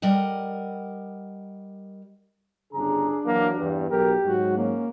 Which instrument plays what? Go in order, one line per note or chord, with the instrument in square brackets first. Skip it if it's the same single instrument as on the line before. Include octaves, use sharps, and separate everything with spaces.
[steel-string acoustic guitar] G3 A#4 D#5 F#5
[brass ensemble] G1 C#3 A#5 [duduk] D4 [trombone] G#4
[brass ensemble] E3 F#3 [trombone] A#3
[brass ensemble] E2 [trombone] G2
[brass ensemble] B1 [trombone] G4 [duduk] A#4
[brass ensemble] G#2 F#3 [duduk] F#4
[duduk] A#3 [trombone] C#4